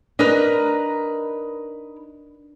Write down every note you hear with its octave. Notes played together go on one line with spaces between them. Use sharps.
D4 D#4 A#4 B4